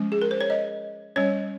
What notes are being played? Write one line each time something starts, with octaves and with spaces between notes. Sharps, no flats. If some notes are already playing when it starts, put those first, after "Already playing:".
Already playing: F3 G#3 C#4
G#4
A#4
C5
C#5
D#5
G3 C#4 C#5